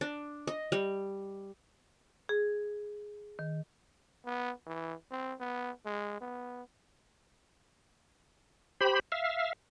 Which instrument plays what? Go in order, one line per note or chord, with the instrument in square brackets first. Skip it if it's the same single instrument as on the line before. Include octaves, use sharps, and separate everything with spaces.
[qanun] D4
D#5
G3
[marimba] G#4
D#3
[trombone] B3
E3
C4
B3
G#3
B3
[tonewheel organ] G4 C5 B5
E5 F5